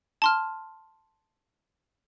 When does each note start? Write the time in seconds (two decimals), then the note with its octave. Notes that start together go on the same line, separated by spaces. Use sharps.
0.22 A5 C6 F6